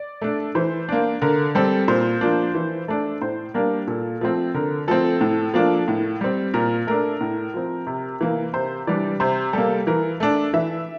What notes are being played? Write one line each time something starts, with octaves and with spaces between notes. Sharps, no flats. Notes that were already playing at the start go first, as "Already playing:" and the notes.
Already playing: D5
A3 D4
E3 C5
A#3 D4
D3 A#4
G3 C4 A4
A#2 C5
F3 A#3 D4
E3
A3 D4
A2 C5
G3 A#3 D4 A#4
A#2 A4
F3 A3 C4
D3 A#4
F3 A3 C4 A4
A2
F3 A#3 D4
A2
G3 C4
A#2 A#4
A3 D4 A#4
A2
F3 C4
C3
E3 A#3
C3 C5
E3 G3 D4 D5
C3 C5
G3 A#3 A4
E3 A#4
A3 D4
E3 E5